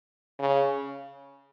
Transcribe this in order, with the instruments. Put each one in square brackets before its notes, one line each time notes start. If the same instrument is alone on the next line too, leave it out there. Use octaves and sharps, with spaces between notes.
[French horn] C#3